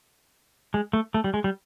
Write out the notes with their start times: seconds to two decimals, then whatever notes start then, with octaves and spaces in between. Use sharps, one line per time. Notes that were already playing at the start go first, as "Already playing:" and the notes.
0.74 G#3
0.93 A3
1.14 A3
1.24 G3
1.34 G#3
1.44 G3